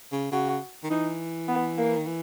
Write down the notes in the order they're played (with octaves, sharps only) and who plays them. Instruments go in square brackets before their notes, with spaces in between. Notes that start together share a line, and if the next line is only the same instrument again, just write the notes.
[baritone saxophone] C#3
[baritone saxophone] C#3 [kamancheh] F#4
[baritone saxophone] D#3
[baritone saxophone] E3 [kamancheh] D#4
[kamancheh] B3
A#3
[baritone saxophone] D#3
E3